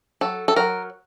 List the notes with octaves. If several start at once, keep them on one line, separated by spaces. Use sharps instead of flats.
F#3 A4
A4
F#3 A#4